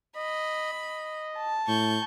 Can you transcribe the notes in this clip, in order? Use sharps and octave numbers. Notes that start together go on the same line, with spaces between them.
D#5 B5
D#5
A5
A2 C#6 G6